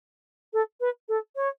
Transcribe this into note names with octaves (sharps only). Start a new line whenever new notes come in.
A4
B4
A4
C#5